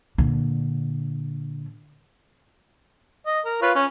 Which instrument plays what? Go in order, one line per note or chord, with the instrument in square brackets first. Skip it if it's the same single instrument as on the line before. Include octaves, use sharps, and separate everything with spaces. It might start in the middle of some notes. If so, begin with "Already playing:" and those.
[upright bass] A#2 D3
[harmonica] D#5
A#4
F4 B4 C#5
C#4